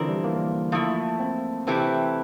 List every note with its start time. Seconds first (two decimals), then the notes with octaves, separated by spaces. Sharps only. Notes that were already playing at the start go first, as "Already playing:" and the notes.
Already playing: D3 E3 F3 C4 E4 A#4 D5
0.08 G3
0.24 A#3
0.72 F3 A3 E4
1.20 C4
1.67 C3 E3 A3 C4 E4 G4